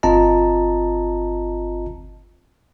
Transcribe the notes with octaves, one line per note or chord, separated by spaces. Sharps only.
G1 C4 F4 D#5 A5 A#5